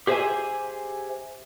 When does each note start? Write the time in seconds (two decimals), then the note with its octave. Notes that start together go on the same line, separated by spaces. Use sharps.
0.07 G4 G#4 C5 D#5 E5 G#5